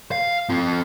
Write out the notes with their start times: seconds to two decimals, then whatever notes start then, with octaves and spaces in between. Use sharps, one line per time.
0.12 F5
0.49 C4 F4